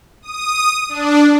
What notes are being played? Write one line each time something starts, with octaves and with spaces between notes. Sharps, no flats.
D#6
D4